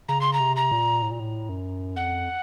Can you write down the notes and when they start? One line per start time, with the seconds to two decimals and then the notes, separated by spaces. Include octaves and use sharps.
0.08 C#3 A#5
0.21 C6
0.33 A#5
0.40 C3
0.56 A#5
0.71 A#2
1.02 A2
1.11 A#2
1.20 A2
1.49 F#2
1.96 F2 F#5